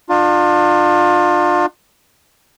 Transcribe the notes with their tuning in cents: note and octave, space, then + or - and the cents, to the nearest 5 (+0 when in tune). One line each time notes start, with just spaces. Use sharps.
D4 +40 F4 +25